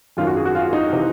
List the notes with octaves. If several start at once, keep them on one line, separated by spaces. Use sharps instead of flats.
G#1 F#2 D#3 F4
F#4
G#4
F#4
F4
D#4
C3 E3